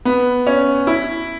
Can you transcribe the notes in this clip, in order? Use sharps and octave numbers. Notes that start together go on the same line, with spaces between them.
B3
C#4
E4